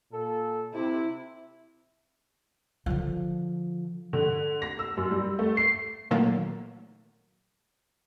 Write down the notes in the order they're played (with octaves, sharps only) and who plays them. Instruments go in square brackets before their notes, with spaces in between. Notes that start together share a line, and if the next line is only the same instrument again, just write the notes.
[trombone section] A#2 A4
[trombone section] C3 [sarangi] E4
[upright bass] D3 F3
[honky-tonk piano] D3
A#6
E6
F#2
G3
A3
C7
[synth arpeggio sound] A#2 D#3 E3 F#3 A3 A#3